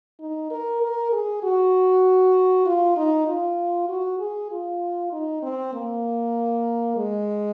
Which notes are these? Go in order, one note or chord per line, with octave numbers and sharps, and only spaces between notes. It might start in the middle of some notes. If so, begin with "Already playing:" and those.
D#4
A#4
A#4
G#4
F#4
F4
D#4
F4
F#4
G#4
F4
D#4
C4
A#3
G#3